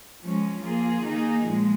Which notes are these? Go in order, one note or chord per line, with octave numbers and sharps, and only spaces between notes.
F3 G#3 C#4
F3 A#3 F4 G#4
D#3 A#3 D#4 G#4
A#2 F3 G#3